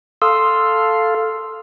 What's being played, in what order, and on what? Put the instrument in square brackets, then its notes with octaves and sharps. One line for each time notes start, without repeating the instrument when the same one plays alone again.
[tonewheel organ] A4 F5 [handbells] C6 D#6 E6